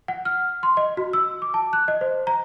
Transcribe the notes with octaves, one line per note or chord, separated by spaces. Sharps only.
F#5
F6
C6
D#5
F#4
E6
D6
A5
F#6
D#5
C5
A#5